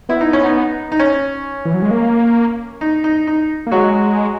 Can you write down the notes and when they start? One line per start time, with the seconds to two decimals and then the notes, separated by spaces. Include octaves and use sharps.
0.09 B3 E4
0.21 D#4
0.33 C#4
0.45 D#4
0.92 D#4
0.99 C#4
1.65 E3
1.74 F#3
1.82 G#3
1.91 A#3
2.81 D#4
3.04 D#4
3.27 D#4
3.66 A#3
3.71 F#3 G#3 F#4